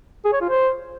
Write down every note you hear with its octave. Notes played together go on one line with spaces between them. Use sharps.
G#4
C#5
F4
C5